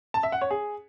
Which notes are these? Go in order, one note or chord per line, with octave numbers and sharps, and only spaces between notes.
A5
E5
F#5
C#5
G#4